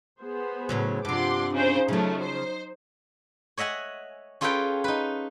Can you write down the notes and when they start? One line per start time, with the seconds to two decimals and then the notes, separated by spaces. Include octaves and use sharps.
0.20 B3 G#4 C5
0.69 A2 C#3 F#3
1.05 G2 C3 F3 D4 F#5 C6 D6
1.53 C#3 D#4 C5
1.88 C#3 F3 F#3 A3
2.22 C5
3.57 C#5 D#5 E5 F#5 G#5
4.41 C#4 F4 G#4 A4 B4 G5
4.84 D#4 B4